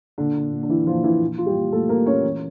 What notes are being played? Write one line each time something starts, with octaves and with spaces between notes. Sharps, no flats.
A#2 D3 D4
A#2
A#2
D4
A#2 E3 E4
A#2 F3 F4
A#2 E3 E4
A#2
A#2 F4
G3 G4
A#2
A#2 A3 A4
A#2 A#3 A#4
A#2 C#4 C#5
E3